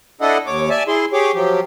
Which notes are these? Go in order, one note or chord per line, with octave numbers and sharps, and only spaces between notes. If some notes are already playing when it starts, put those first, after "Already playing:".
D4 E4 A4 D#5 F#5
D#2 C#5 D6
D5 E5 G#5 A5
E4 G#4 C6
G4 G#4 C#5 D6
F3 F#3 G4